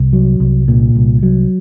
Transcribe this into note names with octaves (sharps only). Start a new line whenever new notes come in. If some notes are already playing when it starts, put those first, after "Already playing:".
Already playing: C2
F#3
C2
A#2
C2
F#3